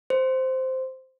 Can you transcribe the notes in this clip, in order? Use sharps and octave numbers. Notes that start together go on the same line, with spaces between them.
C5